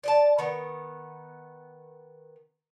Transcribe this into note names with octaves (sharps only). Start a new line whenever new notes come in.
D5 D#5 A5
D#3 B3